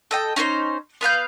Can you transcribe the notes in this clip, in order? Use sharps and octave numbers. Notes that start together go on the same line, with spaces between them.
A4 D#5 G5
C#4 D#4 A#4 C5
B3 B4 F5 G6